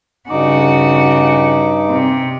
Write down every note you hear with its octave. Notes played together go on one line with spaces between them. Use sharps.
G2 C#3 D#4 F#4 D6
C3